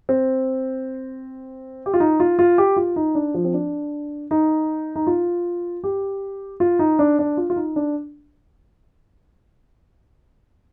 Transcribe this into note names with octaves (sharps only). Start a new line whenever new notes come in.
C4
G4
F4
D#4
F4
F4
G4
F4
D#4
D4
F3
C4
D4
D#4
D#4
F4
G4
F4
D#4
D4
D4
F4
F4
D#4
D4